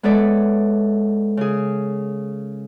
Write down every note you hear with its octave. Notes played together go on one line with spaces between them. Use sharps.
G#3 B3 A4 C#5 D5 E5
C#3 G#4